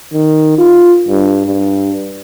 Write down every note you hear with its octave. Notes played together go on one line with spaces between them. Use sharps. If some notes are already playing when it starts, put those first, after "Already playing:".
D#3
F4
G2
G2